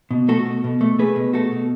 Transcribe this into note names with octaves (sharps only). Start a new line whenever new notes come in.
B2
A3 F#4 A4
B2
B2
A3
A3 G#4 B4
B2
A3 F#4 A4
B2